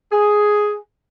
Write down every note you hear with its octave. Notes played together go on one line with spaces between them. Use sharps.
G#4